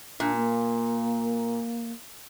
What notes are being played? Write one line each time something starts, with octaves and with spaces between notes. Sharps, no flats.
A#2 D4
A#3